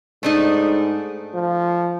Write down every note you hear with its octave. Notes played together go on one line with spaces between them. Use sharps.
G#2 A3 D4 D#4
F3